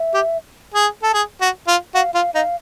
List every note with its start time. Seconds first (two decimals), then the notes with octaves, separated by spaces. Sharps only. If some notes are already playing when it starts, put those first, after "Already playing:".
Already playing: E5
0.14 G4
0.74 G#4
1.03 A4
1.14 G#4
1.41 F#4
1.67 F4
1.95 F#4 F5
2.14 F4 F5
2.35 D#4 F5